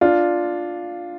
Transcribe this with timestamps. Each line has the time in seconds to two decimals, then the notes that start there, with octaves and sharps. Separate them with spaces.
0.01 D4 F4